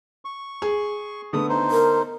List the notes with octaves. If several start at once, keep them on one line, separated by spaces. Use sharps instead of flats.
C#6
G#4
D3 A3 B3 D#6
D#4 C5
A#4